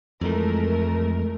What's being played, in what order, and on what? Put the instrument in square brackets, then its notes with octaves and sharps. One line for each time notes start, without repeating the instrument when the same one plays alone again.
[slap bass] F2 E3 [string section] G#3 A3 A#4